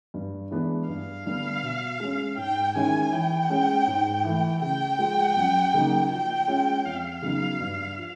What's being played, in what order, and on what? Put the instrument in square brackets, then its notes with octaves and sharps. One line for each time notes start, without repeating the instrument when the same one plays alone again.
[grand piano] G2
E3 G#3 B3 D4
[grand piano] G2 [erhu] F5
[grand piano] D3 G3 B3 D4
B2
G#3 C#4
[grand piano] G#2 [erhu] G5
[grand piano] D#3 G#3 C#4 E4 [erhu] G#5
[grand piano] E3 [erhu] G5
[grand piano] G#3 C#4
G#2
E3 A3
[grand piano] C#3 [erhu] G5
[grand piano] F3 G#3
F#2
C#3 F#3 A#3 D#4
[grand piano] F3 [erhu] G5
[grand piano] G#3 C#4 F4
[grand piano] F2 [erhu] F5
[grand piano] C#3 F#3 B3 D#4
G2
F3